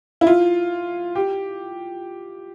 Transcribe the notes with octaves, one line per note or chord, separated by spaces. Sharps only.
E4
F4
G4